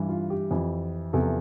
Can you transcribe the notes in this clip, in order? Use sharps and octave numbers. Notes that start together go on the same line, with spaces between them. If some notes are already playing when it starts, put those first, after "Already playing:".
Already playing: G2 E3
F4
G4
F2 E3
E2 C3 F3 A4